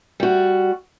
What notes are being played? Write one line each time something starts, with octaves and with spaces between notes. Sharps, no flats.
G3 F#4